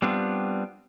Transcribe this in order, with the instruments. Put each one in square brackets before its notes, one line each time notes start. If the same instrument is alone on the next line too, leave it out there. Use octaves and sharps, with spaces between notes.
[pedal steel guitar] G3 B3 C4 D4 F4